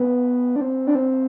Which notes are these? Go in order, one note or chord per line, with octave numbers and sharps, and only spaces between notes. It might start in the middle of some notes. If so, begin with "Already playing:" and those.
Already playing: B3
D4
C4
D4
C4